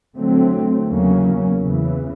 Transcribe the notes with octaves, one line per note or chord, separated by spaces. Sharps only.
D3 F#3 A3 C4
E2 C#3 F#3 A#3 C#4
E2 C#3 E3